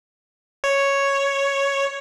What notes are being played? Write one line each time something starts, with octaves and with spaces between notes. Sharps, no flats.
C#5